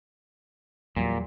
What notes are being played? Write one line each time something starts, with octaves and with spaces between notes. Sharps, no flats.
E2 A#2 F#3 G3